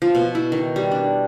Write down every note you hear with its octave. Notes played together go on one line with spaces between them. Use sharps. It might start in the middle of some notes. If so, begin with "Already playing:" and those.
F3
B2
E4
D#3
G3
D4